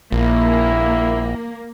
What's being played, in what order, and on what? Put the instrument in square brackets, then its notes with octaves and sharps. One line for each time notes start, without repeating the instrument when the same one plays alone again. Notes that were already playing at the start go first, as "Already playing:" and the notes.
[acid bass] A#1 [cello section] A#3 [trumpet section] E4